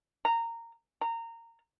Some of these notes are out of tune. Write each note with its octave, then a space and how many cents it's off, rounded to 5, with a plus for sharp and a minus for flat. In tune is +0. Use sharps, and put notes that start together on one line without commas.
A#5 -15
A#5 -20